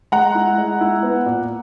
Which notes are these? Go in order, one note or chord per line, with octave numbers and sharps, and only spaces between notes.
G#3 F#5 A#5
E4
G#3
E4
B3
A#2